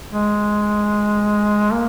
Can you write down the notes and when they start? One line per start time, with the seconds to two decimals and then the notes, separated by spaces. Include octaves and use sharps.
0.12 G#3
1.73 A#3